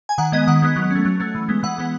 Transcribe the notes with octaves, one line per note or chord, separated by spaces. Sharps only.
G#5
D#3 F#5
G#3 B3 D#5
D#3 F#5
G#3 B3
F#3
A3 C#4
F#3
A3 C#4
E3
G#3 B3
E3 F#5
G#3 B3